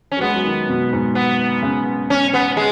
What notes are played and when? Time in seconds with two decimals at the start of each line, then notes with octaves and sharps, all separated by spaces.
0.12 C#4
0.17 F#3
0.21 G#3 B3
0.34 F#3
0.45 D#3
0.69 B2
0.93 G#2
1.15 B3
1.62 C#3
2.10 C#4
2.34 B3
2.57 G#3